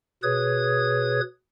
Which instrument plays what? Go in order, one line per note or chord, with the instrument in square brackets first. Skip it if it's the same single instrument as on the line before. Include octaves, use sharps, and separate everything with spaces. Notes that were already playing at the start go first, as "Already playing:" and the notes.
[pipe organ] B2 G#4 B4 C#5 D#6 G#6